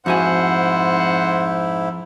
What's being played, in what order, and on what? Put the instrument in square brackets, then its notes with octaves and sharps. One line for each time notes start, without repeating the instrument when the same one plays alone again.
[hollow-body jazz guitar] F2 F#4 G#5 [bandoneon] G#2 E4 [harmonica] C5 F#5